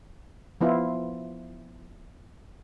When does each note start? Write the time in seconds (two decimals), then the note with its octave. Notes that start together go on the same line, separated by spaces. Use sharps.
0.61 F3 B3 E4 F4